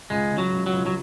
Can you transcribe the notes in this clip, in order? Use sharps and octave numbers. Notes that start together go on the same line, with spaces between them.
C#2 G#3
C#3
F#3
C#2
F#3
C#2
F#3